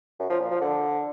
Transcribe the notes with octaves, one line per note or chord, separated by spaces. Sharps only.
F#2
F3
A#2
F3
D3